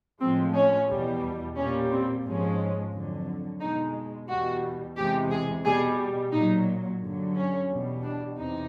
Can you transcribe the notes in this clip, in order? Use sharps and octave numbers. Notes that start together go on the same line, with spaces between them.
A2 F3 G#3 C4
C#4
E2 B2 G3
A#2 G3 C#4
C4
G#2 F3 G#3 C#4
F2 D3 F#3
B2 G#3 D#4
E2 B2 G3 F#4
E2 C3 E3 G#3 G4
G#4
B2 G3 G#4
A#2 F#3 D#4
G2 D3 F#3
C#4
E2 B2 G3
D4
E2 C3 D#4